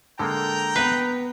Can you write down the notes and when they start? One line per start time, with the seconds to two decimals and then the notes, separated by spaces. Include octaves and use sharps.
0.19 D3 G#3 A#3 A4 G5 A#5
0.76 B3 B4 B5 C7